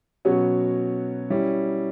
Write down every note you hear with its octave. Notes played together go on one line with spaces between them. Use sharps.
B2 F#3 C#4
G3 C#4 E4